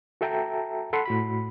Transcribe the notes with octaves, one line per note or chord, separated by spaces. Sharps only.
F#4 A4 E5 G5 A5 A#5
A4 F#5 B5 C6
A2 F#4 B5